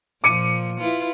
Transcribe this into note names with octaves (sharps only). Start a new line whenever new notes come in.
A#2 F3 D6 C#7 D#7
E4 F4 B4